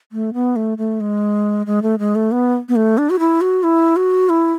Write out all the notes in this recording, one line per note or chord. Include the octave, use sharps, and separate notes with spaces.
A3
B3
A3
A3
G#3
G#3
A3
G#3
A3
B3
B3
A3
D4
F#4
E4
F#4
E4
F#4
E4